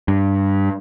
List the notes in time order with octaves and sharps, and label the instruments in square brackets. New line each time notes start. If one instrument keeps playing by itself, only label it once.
[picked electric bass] G2